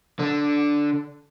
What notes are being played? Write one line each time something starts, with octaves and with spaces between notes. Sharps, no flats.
D3 D4